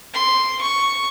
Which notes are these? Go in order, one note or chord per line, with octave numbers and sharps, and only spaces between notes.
C6
C#6